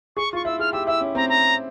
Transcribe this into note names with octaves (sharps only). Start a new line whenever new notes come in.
G#4 C#6
F4 C#6
E4 E6
G#4 F6
G4 E6
E4 E6
C#4
C4 A#5
A#5